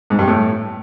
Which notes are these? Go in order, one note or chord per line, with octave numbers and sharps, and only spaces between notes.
G#2
G2
A2